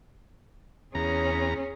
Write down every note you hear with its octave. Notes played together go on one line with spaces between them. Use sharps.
E2 C#4 G#4 A#5